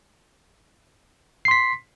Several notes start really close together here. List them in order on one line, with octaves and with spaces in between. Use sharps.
C7 C6 B6